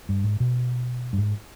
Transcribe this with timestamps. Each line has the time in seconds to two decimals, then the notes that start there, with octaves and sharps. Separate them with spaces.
0.09 G2
0.24 G#2
0.40 B2
1.13 G2
1.18 G#2